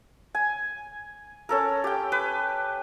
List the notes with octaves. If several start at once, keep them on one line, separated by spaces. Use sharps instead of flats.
G#5
C#4 A4 A#4
G4 G5
B4